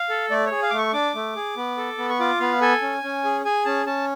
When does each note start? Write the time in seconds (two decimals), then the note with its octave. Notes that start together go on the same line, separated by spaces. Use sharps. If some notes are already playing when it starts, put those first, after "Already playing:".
Already playing: F5
0.09 A4
0.30 A3 D5
0.46 C#5
0.51 G#4
0.62 F5
0.70 A3 D6
0.78 C#6
0.93 D4 D6
1.15 A3
1.36 G#4
1.57 B3
1.77 A4
1.98 B3
2.09 C#6
2.20 F4 D6
2.40 B3 F5
2.61 A4 G#5
2.82 C#4
3.03 C#4
3.24 G#4
3.45 G#4 G#5
3.65 C#4 A5
3.86 C#4 A5